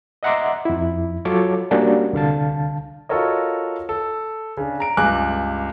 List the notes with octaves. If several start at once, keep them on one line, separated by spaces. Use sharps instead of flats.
D#5 E5 F#5 A#5 C6 D6
F2 E4
F#3 F4 A4 C#5 D6
G3 A#3 C#4 D4 F#4
C2 D3 F5 A5
F4 F#4 A4 A#4 C#5 D#5
A4
C#3 D4
A#5 D7
C#2 G2 G#5 D6 F#6